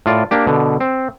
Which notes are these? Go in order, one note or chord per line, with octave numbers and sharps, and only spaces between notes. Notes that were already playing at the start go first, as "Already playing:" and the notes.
A2 F4 D5
A#3 D4 G4
B2 D3
C4